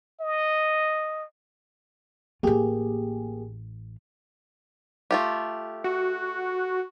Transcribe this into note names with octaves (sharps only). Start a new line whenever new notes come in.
D#5
A1 A#3 F4 G4 G#4
A3 F4 G4
F#4